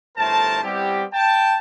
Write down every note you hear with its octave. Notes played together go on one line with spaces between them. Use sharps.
G1 A2 A3 A#4 C5 A5
G3 B3 C4 E4 G4
G5 A5